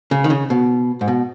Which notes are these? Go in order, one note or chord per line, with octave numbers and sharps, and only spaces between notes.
C#3
D#3
C#3
B2
G#2
B2